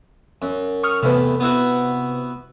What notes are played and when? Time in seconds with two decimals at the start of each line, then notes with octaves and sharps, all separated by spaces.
0.42 F#2
0.83 C#6 D#6 F6
1.03 E2 A2 C3 B4
1.40 B3 E4 F#4